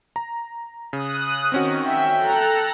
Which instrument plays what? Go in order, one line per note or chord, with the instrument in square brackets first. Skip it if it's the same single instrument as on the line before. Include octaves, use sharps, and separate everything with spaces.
[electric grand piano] A#5
[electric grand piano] C#3 [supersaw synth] D#6 F#6
[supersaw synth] D#3 [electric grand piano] C4 C#4 F#4
[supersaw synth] E5 [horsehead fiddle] G5
[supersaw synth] A4 A#5 F#6